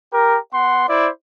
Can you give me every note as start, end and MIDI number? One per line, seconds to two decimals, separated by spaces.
0.13 0.38 67
0.13 0.38 70
0.52 0.85 59
0.52 0.85 78
0.52 0.85 84
0.89 1.08 64
0.89 1.08 72
0.89 1.08 74